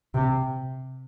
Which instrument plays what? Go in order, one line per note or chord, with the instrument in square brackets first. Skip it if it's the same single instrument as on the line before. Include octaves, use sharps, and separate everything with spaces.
[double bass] C3